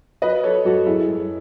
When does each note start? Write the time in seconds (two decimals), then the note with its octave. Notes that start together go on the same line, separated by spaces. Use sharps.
0.22 F#3 B4 D#5
0.43 F#3 A4 C#5
0.65 F#2 F#4 A4
0.86 F#2 E4 G#4
1.09 F#2